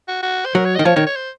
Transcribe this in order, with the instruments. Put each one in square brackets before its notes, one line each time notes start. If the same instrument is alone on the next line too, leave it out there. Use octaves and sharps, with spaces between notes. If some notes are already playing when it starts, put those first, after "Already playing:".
[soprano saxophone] F#4
F#4
C5
[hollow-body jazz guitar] F#3 [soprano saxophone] A#4
[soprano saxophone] C#5
[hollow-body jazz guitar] D#3 [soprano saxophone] D#5
[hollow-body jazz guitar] F3 [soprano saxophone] C#5
[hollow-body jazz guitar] D#3 [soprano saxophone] C#5
[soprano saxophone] C#5
C5